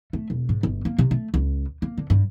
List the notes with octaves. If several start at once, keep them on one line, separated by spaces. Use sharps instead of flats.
A3
E1
G#2
G1
A#3
C3
A3
C#2
A#3
D3
G2